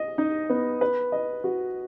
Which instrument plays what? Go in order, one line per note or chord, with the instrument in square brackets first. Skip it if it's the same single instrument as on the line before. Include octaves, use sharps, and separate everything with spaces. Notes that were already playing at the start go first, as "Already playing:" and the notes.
Already playing: [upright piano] D#5
D#4
B3
B4
D#5
F#4